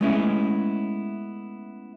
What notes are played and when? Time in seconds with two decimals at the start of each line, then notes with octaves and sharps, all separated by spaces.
0.01 G#3 A3 B3 C#4 E4 G#4